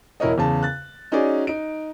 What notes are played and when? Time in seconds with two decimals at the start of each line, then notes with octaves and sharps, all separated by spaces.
0.20 E1 E4 A#4 C#5 D#5
0.38 E2 C#3 A5
0.63 F#6 A6
1.12 C#4 D#4 F#4 G#4 D5
1.47 D#4 D7